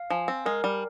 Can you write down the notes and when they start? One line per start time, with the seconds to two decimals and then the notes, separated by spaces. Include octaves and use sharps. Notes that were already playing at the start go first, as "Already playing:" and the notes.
Already playing: F5
0.10 F3 G#5
0.28 C4
0.46 G#3 A#4
0.64 G3